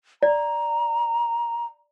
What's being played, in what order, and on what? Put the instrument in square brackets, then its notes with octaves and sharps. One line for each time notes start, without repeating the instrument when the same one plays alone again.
[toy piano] D5 [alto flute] A#5